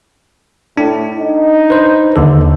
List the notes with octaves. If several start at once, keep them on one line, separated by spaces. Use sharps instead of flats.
A2 D4
D#4
B4 C5
D#2 D3 A4